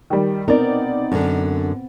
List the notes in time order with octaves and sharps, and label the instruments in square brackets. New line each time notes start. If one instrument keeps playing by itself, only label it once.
[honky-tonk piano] D#3 G3
[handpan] B3 C4 [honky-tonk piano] D#4 D5 [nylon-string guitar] A#4
[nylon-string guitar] F#2 D3